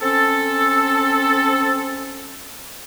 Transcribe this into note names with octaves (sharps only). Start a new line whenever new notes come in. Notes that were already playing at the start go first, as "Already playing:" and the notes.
C4 C#4 A4